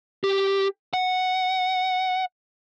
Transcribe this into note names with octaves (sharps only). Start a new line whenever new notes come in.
G4
F#5